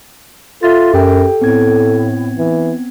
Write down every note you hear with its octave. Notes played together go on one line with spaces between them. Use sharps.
F4 A4 E5 A6
F#2 G4 G5
A2 B3 C4 G#6
E3